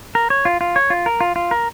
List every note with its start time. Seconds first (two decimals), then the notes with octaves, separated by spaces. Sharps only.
0.15 A#4
0.30 C#5
0.45 F4
0.61 F4
0.76 C#5
0.90 F4
1.06 A#4
1.21 F4
1.36 F4
1.51 A#4